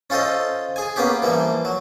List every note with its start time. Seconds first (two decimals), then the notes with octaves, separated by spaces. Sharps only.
0.10 C#4 F4 A4 C5 D#5
0.76 G#4 G#5
0.96 A#3 B3 C#4 G4 G#4
1.22 E3 F3 G3 A#3
1.65 F#3